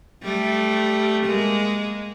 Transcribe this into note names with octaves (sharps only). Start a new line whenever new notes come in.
G3 A3
G#3 A#3